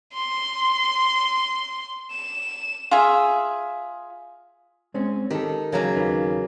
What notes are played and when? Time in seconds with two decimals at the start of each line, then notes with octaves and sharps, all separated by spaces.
0.14 C6
2.11 E7
2.91 F4 G#4 E5
4.94 G#3 C4 C#4
5.30 D#3 G4 A4
5.72 C#3 F#3 A#3
5.96 D#2 D#4 B4